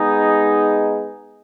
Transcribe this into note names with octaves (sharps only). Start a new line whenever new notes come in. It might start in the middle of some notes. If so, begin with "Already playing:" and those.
Already playing: G#3 B3 D#4 G#4